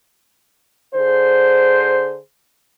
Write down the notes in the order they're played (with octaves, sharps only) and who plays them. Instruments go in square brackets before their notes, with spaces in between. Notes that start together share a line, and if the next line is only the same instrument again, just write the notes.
[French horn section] D3 G#4 C5